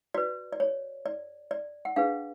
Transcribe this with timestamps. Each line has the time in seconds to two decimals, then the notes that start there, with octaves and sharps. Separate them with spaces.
0.14 F#4 B4 D5
0.53 D5
0.60 C#5
1.06 D5
1.51 D5
1.85 F#5
1.96 D4 G#4 B4 F5